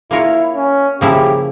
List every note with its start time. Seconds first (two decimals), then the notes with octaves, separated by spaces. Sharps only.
0.11 A#3 E4 F4 A#4 C#5
0.56 C#4
1.01 C#3 F3 A#3 C#4 E4 G4